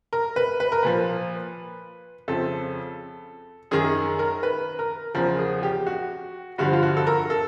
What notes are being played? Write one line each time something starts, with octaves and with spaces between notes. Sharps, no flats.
A#4
B4
B4
A#4
A#2 F3 B4
F2 C#3 F3 A4
F#2 D#3 G#4
A#4
B4
A#4
E2 C#3 F3 A#4
G#4
G4
F#4
G2 D3 F3 F#4
F4
F#4
A4
A#4
A4